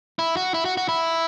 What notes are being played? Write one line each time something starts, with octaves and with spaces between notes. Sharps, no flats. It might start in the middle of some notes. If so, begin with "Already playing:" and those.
E4
F#4
E4
F#4
F#4
E4